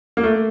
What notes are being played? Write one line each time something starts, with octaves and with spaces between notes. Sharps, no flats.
A#3
A3